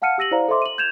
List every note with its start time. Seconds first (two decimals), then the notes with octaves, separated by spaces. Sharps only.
0.02 F5 F#5 A5 F6 C#7 D#7
0.18 G4 E6 A#6 D#7 F#7
0.31 E4 C5 D5 F5 A#5
0.48 A4 C5 D#5 E5 C6 D6
0.62 D#7 F#7
0.78 G6 G#6 E7 F7